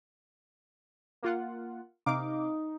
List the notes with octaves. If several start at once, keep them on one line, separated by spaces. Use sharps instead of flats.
A#3 F4 F#5
C3 D#4 F5 D6